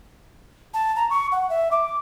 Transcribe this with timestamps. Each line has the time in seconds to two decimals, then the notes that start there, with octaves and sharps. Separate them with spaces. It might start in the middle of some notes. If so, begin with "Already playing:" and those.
0.74 A5
0.96 A#5
1.10 C#6
1.32 F#5
1.50 E5
1.71 D6